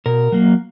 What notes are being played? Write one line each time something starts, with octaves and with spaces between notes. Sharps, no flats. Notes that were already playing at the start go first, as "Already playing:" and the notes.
B2 A#4
F#3 A#3